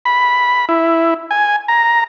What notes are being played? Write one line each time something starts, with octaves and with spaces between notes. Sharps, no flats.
B5
E4
G#5
A#5